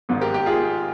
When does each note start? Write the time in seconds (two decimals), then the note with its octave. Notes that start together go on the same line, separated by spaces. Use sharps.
0.09 G#1 G#2 D#3
0.21 G4 A#4
0.34 G4
0.46 F4 G#4